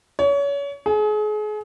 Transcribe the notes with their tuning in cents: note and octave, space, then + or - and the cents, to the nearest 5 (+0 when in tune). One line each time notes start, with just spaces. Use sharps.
C#5 +30
G#4 +35